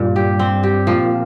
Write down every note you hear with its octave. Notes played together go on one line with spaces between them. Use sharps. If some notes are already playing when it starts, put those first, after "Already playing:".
Already playing: G2 A#2 G3
G4
C4
G4
A#2 F3 A#3